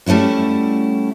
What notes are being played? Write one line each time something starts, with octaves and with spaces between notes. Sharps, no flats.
G3 A3 C#4 E4 F#4